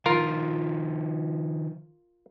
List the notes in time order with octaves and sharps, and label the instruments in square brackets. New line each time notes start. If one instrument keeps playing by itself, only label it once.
[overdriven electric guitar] D#3 F3 [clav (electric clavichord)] F4 A#4